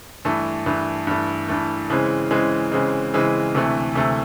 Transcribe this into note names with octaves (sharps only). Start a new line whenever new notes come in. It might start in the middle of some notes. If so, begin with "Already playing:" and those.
G2 E3 A3
G2 E3 A3
G2 E3 A3
G2 E3 A3
C#3 E3 G#3 C4
C#3 E3 G#3 C4
C#3 E3 G#3 C4
C#3 E3 G#3 C4
D2 C3 E3 A3
D2 C3 E3 A3